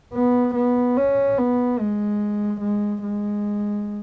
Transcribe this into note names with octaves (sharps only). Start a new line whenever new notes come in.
B3
B3
C#4
B3
G#3
G#3
G#3